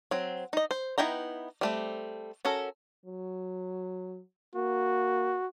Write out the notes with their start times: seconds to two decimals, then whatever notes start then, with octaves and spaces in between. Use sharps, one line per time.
0.11 F#3 C4
0.53 D#4 D#5
0.71 C5
0.98 B3 D#4 E4 G5 A#5
1.61 G3 A3 C4
2.45 C#4 F#4 A4 A#4
3.06 F#3
4.56 A#3 F#4